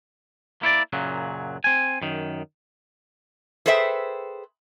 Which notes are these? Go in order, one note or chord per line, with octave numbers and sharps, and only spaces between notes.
A#3 E4 C#5 D5
F#2 A#2 C#3 F#3
C4 G#5
F#2 D#3
G#4 A4 B4 C5 E5 G5